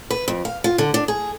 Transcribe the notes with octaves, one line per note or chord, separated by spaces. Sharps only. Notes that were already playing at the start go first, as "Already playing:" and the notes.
B4
F2
F5
F4
D3
D4
G#4